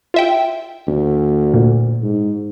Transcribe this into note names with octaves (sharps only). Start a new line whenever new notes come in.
F4 E5 G5
D2
A#2
G#2